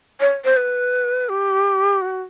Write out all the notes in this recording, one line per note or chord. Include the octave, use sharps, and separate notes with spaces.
C#5
C5
B4
G4
F#4